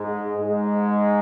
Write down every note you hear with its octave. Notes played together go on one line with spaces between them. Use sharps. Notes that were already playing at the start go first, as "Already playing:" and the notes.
Already playing: G#2 G#3
G#2 G#3